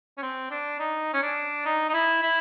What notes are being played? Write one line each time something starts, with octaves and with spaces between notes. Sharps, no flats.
C#4
C4
D4
D#4
C#4
D4
D#4
D#4
E4
E4